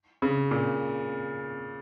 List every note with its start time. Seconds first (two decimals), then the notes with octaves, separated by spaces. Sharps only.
0.22 C#3
0.51 A#2